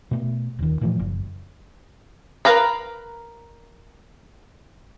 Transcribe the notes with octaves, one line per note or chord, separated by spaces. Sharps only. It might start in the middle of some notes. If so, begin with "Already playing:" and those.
B2 A3
D#1 D#3
A#2 E3 F3 A3
F#1
A#4 B4 F5 A#5 B5